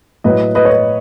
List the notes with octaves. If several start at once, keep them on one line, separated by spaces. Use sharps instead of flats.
A2 F#3 B4 D#5
B4 D#5
C#5
B4 D#5